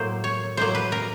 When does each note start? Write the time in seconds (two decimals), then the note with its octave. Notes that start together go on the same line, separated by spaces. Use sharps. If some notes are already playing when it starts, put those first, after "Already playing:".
Already playing: A2 F#3 A#3 C5
0.24 C#5
0.57 A2 F#3 A#3 C5
0.75 B4
0.92 A#4